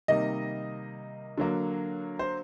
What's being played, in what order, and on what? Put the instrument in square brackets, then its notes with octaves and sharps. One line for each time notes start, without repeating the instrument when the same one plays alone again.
[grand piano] C3 D#3 G3 A#3 D#5
D3 F#3 A#3
C5